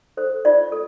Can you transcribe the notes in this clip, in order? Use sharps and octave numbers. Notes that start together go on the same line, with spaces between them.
A4 C5
F4 D5
A4